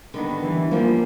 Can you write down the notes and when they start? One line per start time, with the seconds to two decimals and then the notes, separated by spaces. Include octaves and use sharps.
0.14 D3 D#3 G3 B3
0.43 E3
0.71 F3 G3 A#3 C#4